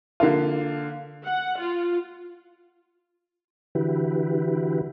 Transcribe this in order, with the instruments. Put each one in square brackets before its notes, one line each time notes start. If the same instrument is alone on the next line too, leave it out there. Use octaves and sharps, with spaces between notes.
[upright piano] D3 A#3 F4
[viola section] F#5
F4
[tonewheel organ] D3 E3 E4 F#4 G4 B4